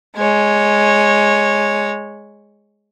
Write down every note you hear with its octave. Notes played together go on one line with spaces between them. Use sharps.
G#3 C#5